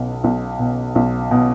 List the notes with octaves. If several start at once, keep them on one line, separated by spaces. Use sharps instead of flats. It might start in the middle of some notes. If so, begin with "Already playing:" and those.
Already playing: B1 B2
B1
B2
B1
B2